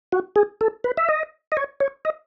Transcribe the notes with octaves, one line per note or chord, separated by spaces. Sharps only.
F#4
G#4
A4
B4
E5
D#5
D#5
C#5
C#5
D#5